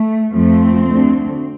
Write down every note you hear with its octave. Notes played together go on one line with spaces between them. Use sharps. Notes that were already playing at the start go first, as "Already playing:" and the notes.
Already playing: A3
F2 F3 A3 C4
D2 D3 A3